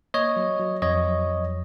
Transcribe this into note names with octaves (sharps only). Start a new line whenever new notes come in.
A#3 C#5 D#5
F#3
F#3
F2 C#5 D#5
F#3
F2